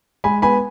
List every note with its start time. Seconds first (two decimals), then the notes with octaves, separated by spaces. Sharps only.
0.24 G#3 G#5 B5
0.42 B3 G#5 B5